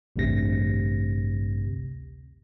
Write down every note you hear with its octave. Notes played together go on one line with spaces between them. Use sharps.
A1 D2 G2 C3 A#6